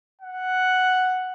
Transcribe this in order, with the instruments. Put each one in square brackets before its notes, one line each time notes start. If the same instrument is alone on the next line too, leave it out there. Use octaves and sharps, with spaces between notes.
[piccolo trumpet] F#5